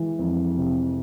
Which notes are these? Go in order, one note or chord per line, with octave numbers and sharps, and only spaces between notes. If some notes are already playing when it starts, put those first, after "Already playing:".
Already playing: E3 G#3
F2
C3